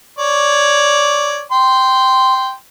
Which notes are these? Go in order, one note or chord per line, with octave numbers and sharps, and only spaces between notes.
C#5 D5
G5 C6